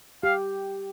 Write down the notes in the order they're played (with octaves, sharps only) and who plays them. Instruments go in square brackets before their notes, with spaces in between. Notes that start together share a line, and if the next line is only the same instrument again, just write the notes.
[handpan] G4 [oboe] F5